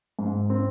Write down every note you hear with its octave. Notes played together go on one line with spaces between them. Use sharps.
G#2
C4